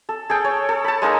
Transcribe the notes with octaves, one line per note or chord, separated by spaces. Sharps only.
A4
G#4 A4 G5
C#5
A4
A5 B5
G#3 A#3 D#4 A#4